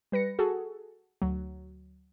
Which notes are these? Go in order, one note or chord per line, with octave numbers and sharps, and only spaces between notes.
G3 B4 A#6 C#7
F#4 G#4 A4
D2 F#3